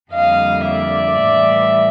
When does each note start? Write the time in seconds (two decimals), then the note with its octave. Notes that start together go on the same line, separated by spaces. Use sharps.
0.12 F2 D3 G3 A#3 D#5 F5
0.66 D5 E5
1.20 A2 E3 G3